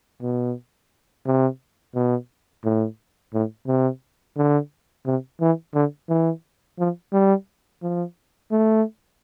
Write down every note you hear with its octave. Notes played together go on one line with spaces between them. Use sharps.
B2
C3
B2
A2
A2
C3
D3
C3
E3
D3
E3
F3
G3
F3
A3